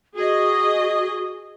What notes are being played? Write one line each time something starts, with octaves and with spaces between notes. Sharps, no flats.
F#4 G#4 D#5